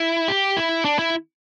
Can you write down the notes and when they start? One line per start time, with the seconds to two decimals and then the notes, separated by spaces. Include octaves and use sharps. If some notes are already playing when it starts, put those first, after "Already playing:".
Already playing: E4
0.28 G4
0.57 E4
0.85 D4
0.99 E4